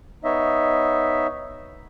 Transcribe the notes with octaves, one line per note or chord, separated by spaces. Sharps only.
B3 D#4 C#5 D#5 E5